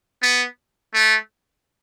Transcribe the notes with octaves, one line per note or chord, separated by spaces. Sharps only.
B3
A3